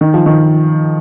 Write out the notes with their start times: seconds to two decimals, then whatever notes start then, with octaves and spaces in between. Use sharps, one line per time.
0.01 D#3
0.14 F3
0.26 D#3